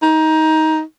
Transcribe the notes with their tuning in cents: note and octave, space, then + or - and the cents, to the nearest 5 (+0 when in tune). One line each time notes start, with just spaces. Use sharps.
D#4 +15